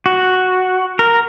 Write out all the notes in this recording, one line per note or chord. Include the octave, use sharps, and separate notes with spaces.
F#4
A#4